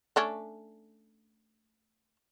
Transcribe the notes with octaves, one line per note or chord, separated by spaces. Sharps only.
A3 C#4 D4